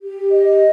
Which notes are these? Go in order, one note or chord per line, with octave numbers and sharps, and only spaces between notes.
G4
D#5